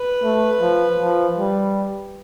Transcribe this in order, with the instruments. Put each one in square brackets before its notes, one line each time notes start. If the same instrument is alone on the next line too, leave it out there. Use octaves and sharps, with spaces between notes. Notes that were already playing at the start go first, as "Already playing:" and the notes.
Already playing: [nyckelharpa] B4
[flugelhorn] A3
F3
F3
G3